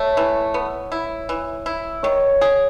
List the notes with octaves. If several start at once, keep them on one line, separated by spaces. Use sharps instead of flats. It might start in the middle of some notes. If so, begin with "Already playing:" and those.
Already playing: A3 C#5
E3
B3
E4
E3
E4
D#3 C#5
G#4